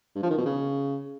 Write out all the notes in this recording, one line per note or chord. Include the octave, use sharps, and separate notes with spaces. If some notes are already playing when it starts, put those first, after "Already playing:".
G2
F3
D#3
B2
C#3